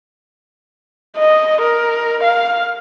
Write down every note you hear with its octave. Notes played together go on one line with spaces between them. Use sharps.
D#5
A#4
F5